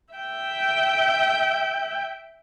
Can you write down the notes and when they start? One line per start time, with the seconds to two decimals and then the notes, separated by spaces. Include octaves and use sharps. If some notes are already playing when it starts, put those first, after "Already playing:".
0.14 E5 G5